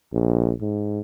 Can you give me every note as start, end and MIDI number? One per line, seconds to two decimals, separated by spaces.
0.12 0.52 34
0.61 1.01 44